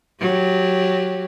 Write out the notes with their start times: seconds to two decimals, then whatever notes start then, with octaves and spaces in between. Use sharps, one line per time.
0.21 F#3 G4